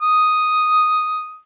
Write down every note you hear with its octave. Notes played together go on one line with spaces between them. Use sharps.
D#6